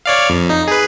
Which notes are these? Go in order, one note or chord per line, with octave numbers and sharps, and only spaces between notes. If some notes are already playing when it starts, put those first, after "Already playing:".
C#5 D5 F5
F2
D#4
G#4 B4